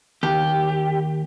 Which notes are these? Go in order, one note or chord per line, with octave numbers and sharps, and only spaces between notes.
D#2 G4